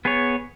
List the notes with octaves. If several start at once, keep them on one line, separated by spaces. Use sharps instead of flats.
B3 G#4 C#5